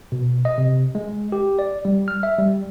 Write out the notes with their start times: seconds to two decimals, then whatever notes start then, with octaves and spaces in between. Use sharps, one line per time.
0.12 B2
0.45 D#5
0.58 C3
0.95 G#3
1.32 G4
1.59 D5
1.85 G3
2.08 F6
2.23 E5
2.39 G3